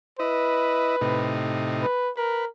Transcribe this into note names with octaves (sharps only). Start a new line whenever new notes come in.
E4 B4 D#5
A2 C3 D#4
B4
A#4 B4